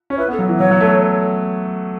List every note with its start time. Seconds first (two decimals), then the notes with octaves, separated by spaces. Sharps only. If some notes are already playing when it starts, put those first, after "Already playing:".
0.10 C#4 C#5
0.18 E4 B4
0.28 B3
0.32 A4
0.39 F#3
0.49 E3
0.60 F#3 C#5
0.71 F#3
0.80 A3